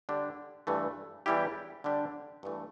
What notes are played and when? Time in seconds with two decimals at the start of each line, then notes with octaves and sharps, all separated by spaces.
0.09 D3 G3 D4 G4
0.67 G2 E3 A3
1.26 E2 E3 G3 E4 G4
1.84 D3 G3 D4 G4
2.43 G2 E3 A3